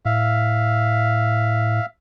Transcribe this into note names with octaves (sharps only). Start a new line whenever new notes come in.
A2 E5 F5